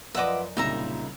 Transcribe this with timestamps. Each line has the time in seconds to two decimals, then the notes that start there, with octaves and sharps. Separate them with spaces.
0.15 F#2 F3 F4 B4 D#5 E5 F#5 D6
0.57 C2 A#2 C#3 D#4 E5 A#5